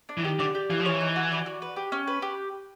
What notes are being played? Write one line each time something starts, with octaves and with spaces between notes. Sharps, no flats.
D4
E3
D#3 G4
D3 D5
G4
E3 F5
F3
E3 C#5
D#4
F#4
D5
F#4
B4
G4
C#4
B4
G4